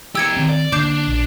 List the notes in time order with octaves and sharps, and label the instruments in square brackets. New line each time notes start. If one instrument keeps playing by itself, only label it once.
[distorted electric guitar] G4 A#4 [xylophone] E6 G#6 C#7
[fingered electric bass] D#3 C4
[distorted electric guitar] D5
[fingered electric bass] D3 A#3 [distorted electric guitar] D4 [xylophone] D6 G6 C7
[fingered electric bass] A#1